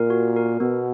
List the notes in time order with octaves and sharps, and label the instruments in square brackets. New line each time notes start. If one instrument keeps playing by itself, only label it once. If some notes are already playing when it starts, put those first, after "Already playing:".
Already playing: [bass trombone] A#2 [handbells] A#4
[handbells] F#4
A#4
[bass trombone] B2 [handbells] B3